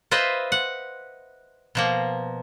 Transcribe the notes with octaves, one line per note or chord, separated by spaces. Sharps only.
F4 B4 C5 D#5 E5
F#5
B2 F3 A#3